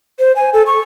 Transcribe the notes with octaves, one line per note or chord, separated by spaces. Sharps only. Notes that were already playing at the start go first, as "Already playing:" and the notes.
C5
G#5
A4
C#6